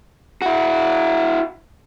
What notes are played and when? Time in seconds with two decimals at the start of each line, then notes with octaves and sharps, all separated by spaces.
0.42 E4 F#4